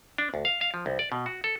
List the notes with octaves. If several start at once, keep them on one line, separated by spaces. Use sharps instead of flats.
D4
D2
F5
F5
F3
C2
D5
B2
F#4
A4